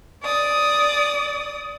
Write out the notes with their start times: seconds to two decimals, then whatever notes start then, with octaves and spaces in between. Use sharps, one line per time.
0.24 D5 D#6